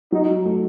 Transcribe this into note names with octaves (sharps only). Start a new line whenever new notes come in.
F#3 D#4
A3